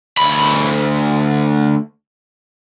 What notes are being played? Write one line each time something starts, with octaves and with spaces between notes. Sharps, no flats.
D2 B5